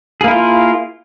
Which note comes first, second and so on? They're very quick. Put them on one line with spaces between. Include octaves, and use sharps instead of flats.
G#4 A#3 E4 F4